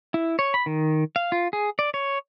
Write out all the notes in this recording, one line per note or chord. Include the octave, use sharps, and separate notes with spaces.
E4
C#5
B5
D#3
F5
F4
G#4
D5
C#5